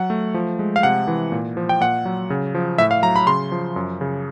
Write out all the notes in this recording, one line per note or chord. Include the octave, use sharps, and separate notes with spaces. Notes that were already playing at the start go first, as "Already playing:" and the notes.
Already playing: F#3 F#5
A3
F3
G#3
F5
C3 F#5
E3
A#2
F3
G5
A#2 F#5
F#3
C#3
F3
A2 E5
F5
F#3 A#5
B5
C#3 C6
F3
F#2
C#3